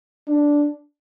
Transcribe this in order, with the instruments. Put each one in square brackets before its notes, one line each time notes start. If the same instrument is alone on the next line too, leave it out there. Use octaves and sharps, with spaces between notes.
[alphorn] D4